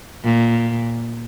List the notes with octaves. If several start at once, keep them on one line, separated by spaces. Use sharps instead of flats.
A#2